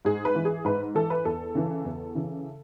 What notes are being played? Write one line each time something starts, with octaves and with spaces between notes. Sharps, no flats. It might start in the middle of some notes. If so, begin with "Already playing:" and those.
G#2 G#4
B4
E3
G#4
G#2 B4
E3 A4
B4
E2 A4
C#3 E3
E2
C#3 E3